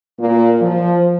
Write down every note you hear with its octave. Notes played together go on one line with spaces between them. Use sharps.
A#2 A#3
F3